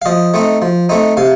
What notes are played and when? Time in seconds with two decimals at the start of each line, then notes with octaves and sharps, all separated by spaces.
0.02 F5
0.06 F3 D#5
0.34 A3 C4 D#4
0.62 F3
0.89 A3 C4 D#4
1.17 C3 F5